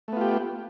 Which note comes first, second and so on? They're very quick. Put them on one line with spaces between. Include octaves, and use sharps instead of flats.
A3 B3 F4 G4